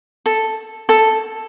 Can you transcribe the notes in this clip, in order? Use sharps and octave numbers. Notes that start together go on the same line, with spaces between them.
A4
A4